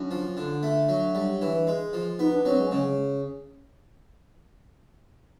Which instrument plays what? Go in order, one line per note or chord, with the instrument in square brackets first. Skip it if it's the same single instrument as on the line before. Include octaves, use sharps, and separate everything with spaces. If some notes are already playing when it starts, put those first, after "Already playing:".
Already playing: [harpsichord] F#2 [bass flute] D4
[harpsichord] F3
D3
[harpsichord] A3 [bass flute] D4
[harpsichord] F#3
G3
E3
G#3
F3
[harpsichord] B3 [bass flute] D#4
[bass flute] D4
[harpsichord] F#3 [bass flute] C4
[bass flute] G#3
[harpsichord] C#3 [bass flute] G#3